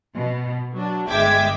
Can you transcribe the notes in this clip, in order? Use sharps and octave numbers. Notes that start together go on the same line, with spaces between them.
B2
F#3 D4
G1 G#3 E5 G5 D6 G#6